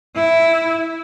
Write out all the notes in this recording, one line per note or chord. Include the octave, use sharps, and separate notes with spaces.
E4